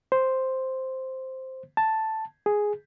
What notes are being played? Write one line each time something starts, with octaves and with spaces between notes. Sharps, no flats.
C5
A5
G#4